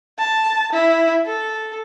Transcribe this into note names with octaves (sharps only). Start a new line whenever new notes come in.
A5
E4
A4